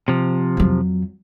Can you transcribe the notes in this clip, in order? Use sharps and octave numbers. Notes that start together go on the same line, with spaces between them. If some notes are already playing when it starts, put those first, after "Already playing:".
C3 F3
F2 F#3